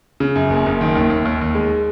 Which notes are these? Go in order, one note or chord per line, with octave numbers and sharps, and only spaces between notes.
C#3
F#2
F#1
F#1
D#3
D#2
D#2
D#2
D#2
G#3